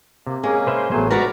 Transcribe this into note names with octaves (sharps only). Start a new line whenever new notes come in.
C3 A#3
G#3 A#3 C#4 G#4
B4 C5 E5 G#5
A1 F#3 A3 B3 G#4 C5
G#3 F#4 A#4 B4 D5 A#5 C#6